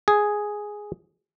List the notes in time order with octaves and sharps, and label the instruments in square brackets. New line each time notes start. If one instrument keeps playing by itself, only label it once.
[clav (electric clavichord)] G#4